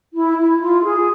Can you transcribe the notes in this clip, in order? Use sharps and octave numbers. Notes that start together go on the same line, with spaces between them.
E4
E4
F4
G#4